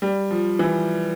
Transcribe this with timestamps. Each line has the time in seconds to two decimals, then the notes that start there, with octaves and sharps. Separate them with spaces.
0.02 G3
0.31 F3
0.59 E3